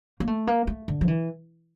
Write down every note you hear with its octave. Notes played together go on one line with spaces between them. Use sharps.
A#3
A3
A#3
A3
D3
F3
E3